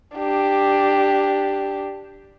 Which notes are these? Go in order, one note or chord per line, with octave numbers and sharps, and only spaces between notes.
D4 G4